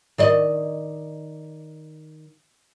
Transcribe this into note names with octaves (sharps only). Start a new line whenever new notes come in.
D#3 D5 D#5